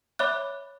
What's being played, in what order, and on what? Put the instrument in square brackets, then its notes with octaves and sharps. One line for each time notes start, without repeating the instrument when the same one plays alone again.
[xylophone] C#5 E5 B5 D6 F#6